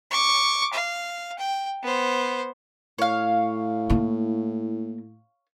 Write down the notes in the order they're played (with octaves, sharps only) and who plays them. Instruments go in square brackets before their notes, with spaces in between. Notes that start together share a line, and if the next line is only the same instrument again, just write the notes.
[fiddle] C#6 D6
F5
G5
B3 C5
[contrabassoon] A2 [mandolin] C#5 F5
[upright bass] A#3 E4